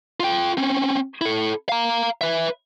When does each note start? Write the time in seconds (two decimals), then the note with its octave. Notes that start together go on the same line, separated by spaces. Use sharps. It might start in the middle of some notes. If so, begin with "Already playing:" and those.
0.20 F4 G5
0.57 C4 C#4
1.21 E4 A4
1.69 F5 A#5
2.21 B4 E5